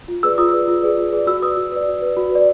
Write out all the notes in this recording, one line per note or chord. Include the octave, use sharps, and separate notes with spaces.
F4
G#4 B4 D5 E6
F4 D#6
G#4 B4 D5
F4
G#4 B4 D5
F4
G#4 B4 D5
F#4 E6
B4 D5 D#6
F#4
B4 D5
F#4
B4 D5
F#4
B4 D5